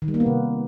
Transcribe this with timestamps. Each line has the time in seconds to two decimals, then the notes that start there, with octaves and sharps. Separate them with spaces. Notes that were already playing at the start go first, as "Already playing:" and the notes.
0.02 D#3
0.08 G3
0.14 A#3
0.20 B3
0.26 C3